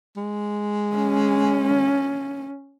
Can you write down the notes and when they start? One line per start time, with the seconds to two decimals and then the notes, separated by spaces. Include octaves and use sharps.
0.17 G#3
0.96 C#4